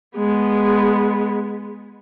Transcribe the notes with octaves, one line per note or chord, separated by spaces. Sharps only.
G#3 B3